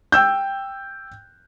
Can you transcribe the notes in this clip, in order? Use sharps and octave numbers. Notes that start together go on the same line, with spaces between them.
G5 E6 G6